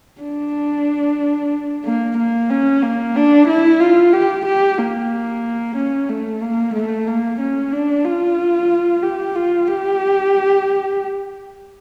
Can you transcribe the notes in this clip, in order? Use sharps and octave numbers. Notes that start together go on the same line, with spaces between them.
D4
A#3
A#3
C#4
A#3
D4
E4
F4
G4
G4
A#3
C#4
A3
A#3
A3
A#3
C#4
D4
F4
G4
F4
G4